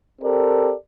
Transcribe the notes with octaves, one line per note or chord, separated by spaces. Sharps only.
C4 G4 A4 A#4 D5